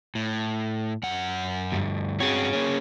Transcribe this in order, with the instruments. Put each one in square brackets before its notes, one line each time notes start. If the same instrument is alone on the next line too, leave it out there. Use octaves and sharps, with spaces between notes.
[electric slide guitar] A2
F#2 F#5
[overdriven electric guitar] D2 G2
[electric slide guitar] G2 C4 F#4 [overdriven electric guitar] G#4 C#5
[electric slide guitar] A#3 C#4